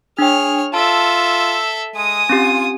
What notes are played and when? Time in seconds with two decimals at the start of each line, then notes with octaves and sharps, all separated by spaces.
0.19 D4 G#4 C#5 G5 F6
0.74 F4 A4 E5 A5
1.96 G#3 G#5 D#6
2.29 C4 C#4 F4 G4